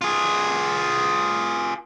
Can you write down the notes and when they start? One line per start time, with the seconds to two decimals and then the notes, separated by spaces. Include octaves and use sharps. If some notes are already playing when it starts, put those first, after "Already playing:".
0.01 F4 G#4